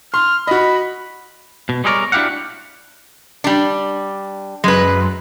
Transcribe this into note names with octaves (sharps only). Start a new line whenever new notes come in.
C6 F6
F#4 D#5 B5
B2
G3 G#3 G#4 A#4 C#5 D5
D4 E4 F#4 G4 F5 F#5
G3 D4
F#2 G#3 B4